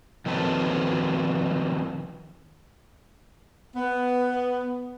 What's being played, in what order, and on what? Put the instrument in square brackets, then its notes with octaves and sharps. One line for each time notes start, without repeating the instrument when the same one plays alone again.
[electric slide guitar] D#3 F3 F#3 C4 A4 B4
[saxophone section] B3